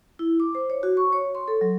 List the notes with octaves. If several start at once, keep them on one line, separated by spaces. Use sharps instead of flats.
E4
D6
C5
C#5
F#4
C#6
C#5
C6
A4
F#3